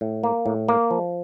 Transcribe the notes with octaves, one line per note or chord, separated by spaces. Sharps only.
A2
A#3
A2
A#3
F3